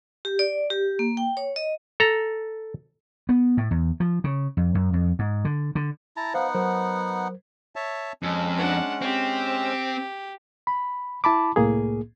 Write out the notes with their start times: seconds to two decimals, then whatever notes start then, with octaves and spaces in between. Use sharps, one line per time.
0.25 G4
0.39 D5
0.70 G4
0.99 A#3
1.17 G5
1.37 C#5
1.56 D#5
2.00 A4 A#5
3.29 B3
3.57 A2
3.71 E2
4.00 F3
4.24 C#3
4.57 F2
4.75 F#2
4.93 F2
5.19 G#2
5.45 D3
5.75 D3
6.17 E4 A5 A#5
6.34 B3 D#4 C5 F5 F#5
6.55 F#3 A#4 C5
7.76 C#5 E5 A5
8.23 F2 G#3 C#4
8.58 D4 F#5
9.02 C4 G4
10.67 B5
11.24 E4 A5 B5 D6
11.56 C2 A2 A#3 G#4